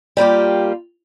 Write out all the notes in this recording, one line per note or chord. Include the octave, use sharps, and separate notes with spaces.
G3 A#3 F4 G4